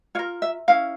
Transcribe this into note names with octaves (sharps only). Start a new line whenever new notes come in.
F4 A#4 C#5
E5
C#4 E4 A#4 F5